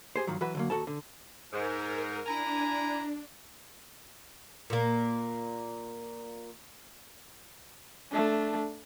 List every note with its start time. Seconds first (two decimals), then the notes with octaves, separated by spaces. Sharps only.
0.16 G4 G#4 C5
0.27 G2 D#3 F3 F#3
0.41 E3 F#3 F#4 B4
0.55 D3 F#3 A#3
0.70 D#2 F#4 A4 A5
0.87 D3
1.53 G#2 A#4
2.27 D4 E4 G#5 A#5
4.70 A#2 A#3
8.12 A3 D4